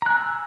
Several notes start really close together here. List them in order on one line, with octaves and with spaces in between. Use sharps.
A#5 F#6 G#5 E6